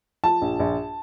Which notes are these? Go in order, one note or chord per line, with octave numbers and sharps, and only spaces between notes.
F3 A5
A#1
A#1